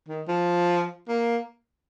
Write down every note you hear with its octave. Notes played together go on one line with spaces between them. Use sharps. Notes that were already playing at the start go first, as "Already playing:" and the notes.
D#3
F3
A#3